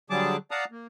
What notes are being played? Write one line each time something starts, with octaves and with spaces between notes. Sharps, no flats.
D3 F#3 G3 G#4 A5 D6
D5 F5 F#5 A5 A#5 D#6
A#3